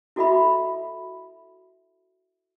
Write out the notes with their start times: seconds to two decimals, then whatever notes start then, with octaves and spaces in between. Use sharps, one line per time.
0.16 E4 F#4 A4 D#5 E5 B5